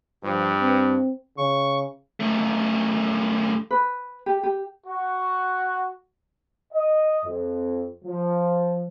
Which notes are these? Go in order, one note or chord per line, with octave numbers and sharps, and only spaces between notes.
G2 F3 B4
C4
C#3 C#6
F#2 A3
B4
G4
G4
F#4
D#5
F2
F3